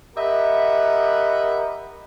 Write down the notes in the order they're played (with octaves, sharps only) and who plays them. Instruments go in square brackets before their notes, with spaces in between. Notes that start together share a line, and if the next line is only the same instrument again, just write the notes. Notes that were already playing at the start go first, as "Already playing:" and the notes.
[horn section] G4 A#4 D#5 E5 F#5 B5